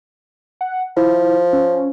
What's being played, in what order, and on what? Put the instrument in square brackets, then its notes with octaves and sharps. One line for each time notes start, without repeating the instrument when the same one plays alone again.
[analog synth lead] F#5
[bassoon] F3 [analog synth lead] E4
[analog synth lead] C#4